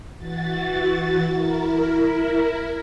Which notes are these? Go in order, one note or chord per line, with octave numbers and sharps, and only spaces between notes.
E3 F#4 A6
E4 A#4